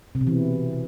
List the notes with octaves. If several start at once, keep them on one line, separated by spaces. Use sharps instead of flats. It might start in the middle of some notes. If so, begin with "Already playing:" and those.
C3
B2
E3